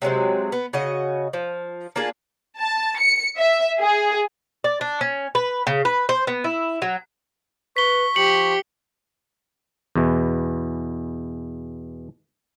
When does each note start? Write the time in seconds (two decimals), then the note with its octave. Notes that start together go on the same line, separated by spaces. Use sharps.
0.02 C3 F#3 G#3 C4
0.52 B3
0.73 C#3 F#4 D#5
1.33 F3
1.96 A#3 D4 F4 G#4
2.58 A5
2.99 C#7
3.37 E5
3.80 G#4
4.64 D5
4.81 D4
5.01 C#4
5.35 B4
5.67 C#3
5.85 B4
6.09 C5
6.27 B3
6.44 E4
6.82 F#3
7.77 B4 C#6 B6 G7
8.16 F3 G4 C#7 F#7
9.96 E2 B2 E3